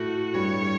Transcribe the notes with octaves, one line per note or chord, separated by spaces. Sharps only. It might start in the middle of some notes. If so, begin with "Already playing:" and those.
Already playing: A2 A3 F#4
G2 G3 C#5
G3